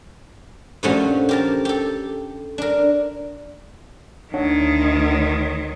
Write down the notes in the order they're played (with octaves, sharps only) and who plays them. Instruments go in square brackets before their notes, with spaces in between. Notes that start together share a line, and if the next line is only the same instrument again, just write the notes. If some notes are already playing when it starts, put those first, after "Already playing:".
[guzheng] G2 A#2 F3 A3 C#4 F#4
G4 A#4 A5
G4 A4
D4 A#4
[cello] D2 D#3 [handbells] D4 C#5 F#5
[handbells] C#5